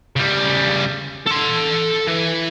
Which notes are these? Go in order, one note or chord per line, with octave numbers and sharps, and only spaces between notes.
C#3 G3
A4 C6
E3